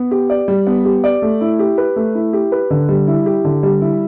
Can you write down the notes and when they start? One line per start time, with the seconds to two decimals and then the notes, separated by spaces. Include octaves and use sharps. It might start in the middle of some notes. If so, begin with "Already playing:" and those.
Already playing: B3
0.11 G4
0.30 D5
0.48 G3
0.67 B3
0.85 G4
1.04 D5
1.22 A3
1.41 E4
1.59 G4
1.78 B4
1.96 A3
2.15 E4
2.33 G4
2.52 B4
2.70 D3
2.89 G3
3.07 E4
3.26 G4
3.44 D3
3.63 G3
3.81 E4